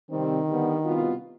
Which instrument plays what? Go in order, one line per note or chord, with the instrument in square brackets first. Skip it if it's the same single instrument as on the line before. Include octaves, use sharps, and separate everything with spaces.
[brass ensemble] C3 G3 C4 [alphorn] D#3
[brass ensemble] D3 G3 B3
C2 B2 B3 F4